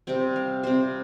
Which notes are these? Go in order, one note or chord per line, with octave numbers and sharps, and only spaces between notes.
C3 G3 C4 G5
F5
C3 G3 C4 C5